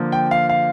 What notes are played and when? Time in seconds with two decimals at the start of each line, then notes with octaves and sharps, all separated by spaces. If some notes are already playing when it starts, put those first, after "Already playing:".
Already playing: D3 F3 A#3
0.12 G5
0.31 F5
0.49 F5